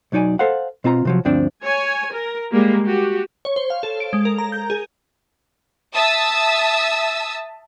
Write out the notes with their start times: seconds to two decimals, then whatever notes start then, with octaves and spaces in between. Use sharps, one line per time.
0.12 B1 F#3 D#4 D5 G#5
0.39 A4 C5 F5 F#5
0.84 B2 C4 F4 A5 A#5
1.05 C3 F3 F#3
1.25 D2 G2 F3 C4 D4 D5
1.64 C#5 G#5
2.12 A#4
2.51 G3 G#3 A#3
2.84 F#4 G4
3.45 C#5
3.56 C5
3.70 F5
3.83 A4
4.00 D7
4.13 G#3
4.25 A#4
4.38 A#5
4.52 G6
4.70 G#4
5.95 E5 A5 D#6 E6